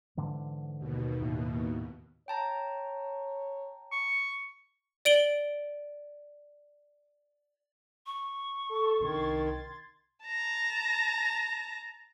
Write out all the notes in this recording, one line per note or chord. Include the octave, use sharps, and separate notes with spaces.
G#2 D3 E3
D#2 B2
A2
C#5 G5 A5 A#5
C#6
D5 D7 F#7 G7
C#6
A4
C2 D#3 D4 C6 G#6 A6
A5 A#5